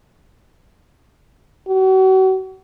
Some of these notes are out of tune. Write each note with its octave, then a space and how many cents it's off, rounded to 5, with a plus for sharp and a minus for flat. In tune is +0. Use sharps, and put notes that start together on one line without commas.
F#4 +40